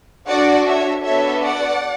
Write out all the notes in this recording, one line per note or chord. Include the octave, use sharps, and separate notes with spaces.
D4 F#4 A4 D5 F#5
C#5 E5
B3 D4 F#4 A4 C#5 E5
D5 F#5